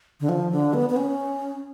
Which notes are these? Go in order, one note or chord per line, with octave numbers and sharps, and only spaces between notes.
D3
F3
D3
B3
B3
C#4